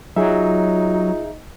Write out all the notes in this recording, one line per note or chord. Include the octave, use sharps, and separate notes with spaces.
F#3 D#4 F4 G#4 E5